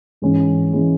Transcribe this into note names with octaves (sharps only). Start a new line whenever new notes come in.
G#2 E3 G#3 C#4
E3 G#3 C#4